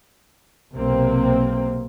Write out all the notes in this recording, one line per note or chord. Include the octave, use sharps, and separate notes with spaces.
B1 C3 A#3 C4